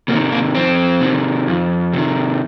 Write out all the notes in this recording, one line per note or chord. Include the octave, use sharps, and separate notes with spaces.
C3 A#3
D#3
A#3
F2 C4
C3 D#3
F2
C3 D#3